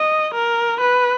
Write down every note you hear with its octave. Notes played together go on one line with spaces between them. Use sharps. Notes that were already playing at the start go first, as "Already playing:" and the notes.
Already playing: D#5
A#4
B4